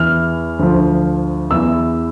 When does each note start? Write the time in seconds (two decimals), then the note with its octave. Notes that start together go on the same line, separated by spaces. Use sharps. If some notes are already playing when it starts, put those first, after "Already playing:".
Already playing: E2 E3 F6
0.59 D2 D3 F3
1.51 E2 E3 E6